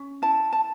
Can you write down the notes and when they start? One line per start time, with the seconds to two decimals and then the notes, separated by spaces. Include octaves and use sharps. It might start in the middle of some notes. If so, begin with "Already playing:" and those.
Already playing: C#4
0.22 E4 A5
0.53 A5